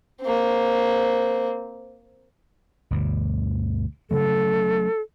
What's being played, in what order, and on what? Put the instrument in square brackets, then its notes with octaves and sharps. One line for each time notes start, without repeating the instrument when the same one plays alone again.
[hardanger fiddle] A#3 C4
[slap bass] G1 D2 B2
[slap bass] C#3 F#3 A3 [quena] A4